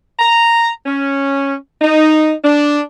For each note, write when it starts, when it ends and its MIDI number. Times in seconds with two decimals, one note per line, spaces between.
0.19 0.70 82
0.86 1.55 61
1.82 2.32 63
2.44 2.80 62